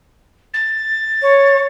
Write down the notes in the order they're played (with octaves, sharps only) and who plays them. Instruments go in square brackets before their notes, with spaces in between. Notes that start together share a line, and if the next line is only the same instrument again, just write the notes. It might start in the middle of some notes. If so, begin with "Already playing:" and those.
[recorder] A6
[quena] C#5